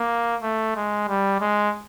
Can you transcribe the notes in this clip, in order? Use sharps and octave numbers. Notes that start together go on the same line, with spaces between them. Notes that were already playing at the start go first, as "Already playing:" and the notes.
Already playing: A#3
A3
G#3
G3
G#3